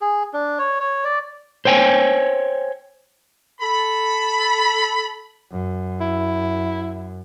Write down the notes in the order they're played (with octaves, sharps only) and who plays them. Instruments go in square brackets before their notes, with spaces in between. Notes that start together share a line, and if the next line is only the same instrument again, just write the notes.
[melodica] G#4
D4
C#5
C#5
D5
[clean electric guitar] C5 C#5 G5 G#5
[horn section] A4 B5
[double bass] F#2
[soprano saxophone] E4